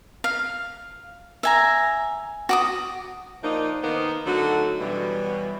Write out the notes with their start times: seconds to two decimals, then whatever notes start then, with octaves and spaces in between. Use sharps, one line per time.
0.24 F5
1.43 E5 G#5 A#5
2.49 F#4 D6 D#6
3.43 F3 A#3 D4 D#4
3.83 D#3 A#3 B3 D#4 C5
4.26 D3 F#3 A3 D#4 F#4
4.80 B2 E3 F#3 G3